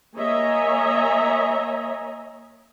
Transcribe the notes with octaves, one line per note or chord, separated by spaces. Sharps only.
A#3 C#5 D#5 E5 G#5 A#5